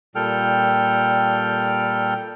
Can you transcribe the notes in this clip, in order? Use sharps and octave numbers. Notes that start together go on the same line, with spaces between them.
A#2 G3 A4 G5 F6